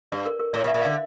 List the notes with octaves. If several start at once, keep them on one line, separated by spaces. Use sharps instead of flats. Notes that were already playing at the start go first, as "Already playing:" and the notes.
G2 D5
A#4
A#4
A2 D5
A#2
E5
A#2
D3 F5